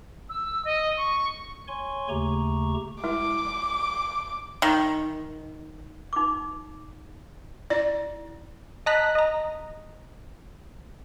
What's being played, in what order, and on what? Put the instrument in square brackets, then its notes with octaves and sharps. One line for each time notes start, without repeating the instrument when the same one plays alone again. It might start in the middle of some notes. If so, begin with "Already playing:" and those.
[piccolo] E6
D#5
C#6
[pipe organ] C#5 G#5 C6 C#6
D#2 C#3 A3 G4 A#5 C#6
[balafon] G#3 E4 [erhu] D6
[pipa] D#3
[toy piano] D#4 D6
[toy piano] E4 [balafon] D5
[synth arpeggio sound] D#5 A5 A#5 F#6 B6
D#5 A#5